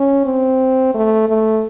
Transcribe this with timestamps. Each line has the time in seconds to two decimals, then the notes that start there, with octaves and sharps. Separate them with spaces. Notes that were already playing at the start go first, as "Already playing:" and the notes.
Already playing: C#4
0.25 C4
0.94 A3
1.29 A3